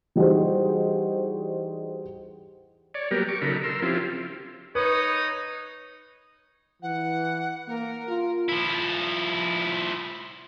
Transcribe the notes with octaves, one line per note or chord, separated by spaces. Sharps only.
E3 G3 D#4 F#4 G#4 C5
C#5 D5
F#3 G3 A#3 B3 G4 A#4
C#6 D6
C#3 F#3 D#4 A4 A#4 B5
A#4 C6 E6
F3 C4 C#4 E4 F4 G4
D#4 B4 C#5 D#6
E3 F#5
A#3 A#4
F4
F3 E4